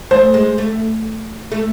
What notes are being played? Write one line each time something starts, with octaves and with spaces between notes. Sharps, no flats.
A3 C5
G#3
A3
A3